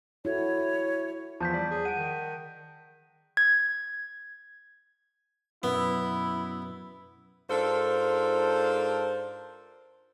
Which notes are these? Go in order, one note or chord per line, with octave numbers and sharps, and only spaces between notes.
E4 F#4 A4 C#5
E2 F3 A5 G6 B6
G3 D5
G#4
F#5 D7 D#7
D#3 D#7
G#6
F#2 B2 B3 E4
G#2 D4 F4 A4 A#4 C5